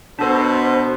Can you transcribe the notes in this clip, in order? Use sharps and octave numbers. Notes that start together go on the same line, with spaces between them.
B2 D4 A4 C5